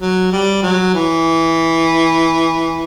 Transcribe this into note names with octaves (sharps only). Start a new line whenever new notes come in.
F#3
G3
F#3
E3